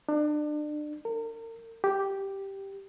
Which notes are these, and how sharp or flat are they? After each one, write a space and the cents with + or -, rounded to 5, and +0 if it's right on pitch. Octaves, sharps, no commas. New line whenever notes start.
D4 +35
A#4 -40
G4 -5